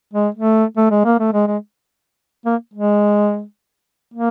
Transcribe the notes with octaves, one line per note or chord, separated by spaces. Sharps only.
G#3
A3
A3
G#3
A#3
A3
G#3
G#3
A#3
G#3
A#3